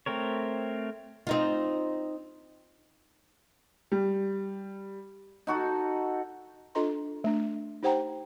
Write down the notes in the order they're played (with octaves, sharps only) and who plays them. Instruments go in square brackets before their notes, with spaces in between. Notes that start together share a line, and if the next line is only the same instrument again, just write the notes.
[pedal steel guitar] A3 C4 A#4 C#5
[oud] C4 D#4 F4
[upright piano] G3
[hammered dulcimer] D#4 F#4 A4
[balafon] D4 F4 A4 D#5 A#5 C6
A3 D4
D#4 G4 C5 F#5 G5 A#5